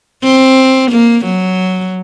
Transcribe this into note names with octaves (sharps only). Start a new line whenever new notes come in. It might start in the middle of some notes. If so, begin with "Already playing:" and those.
C4
A#3
F#3